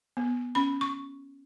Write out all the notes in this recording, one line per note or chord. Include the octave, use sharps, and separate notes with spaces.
B3
C#4 B5
C#6